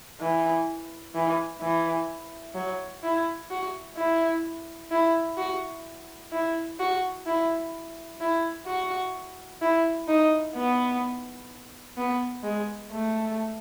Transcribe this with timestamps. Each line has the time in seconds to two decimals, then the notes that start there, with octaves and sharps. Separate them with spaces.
0.20 E3
1.15 E3
1.61 E3
2.55 F#3
3.03 E4
3.50 F#4
3.96 E4
4.91 E4
5.38 F#4
6.32 E4
6.79 F#4
7.26 E4
8.21 E4
8.67 F#4
9.61 E4
10.08 D#4
10.55 B3
11.97 B3
12.43 G#3
12.91 A3